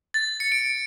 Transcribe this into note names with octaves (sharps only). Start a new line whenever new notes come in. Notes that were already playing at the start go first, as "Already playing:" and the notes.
A6
C#7
D7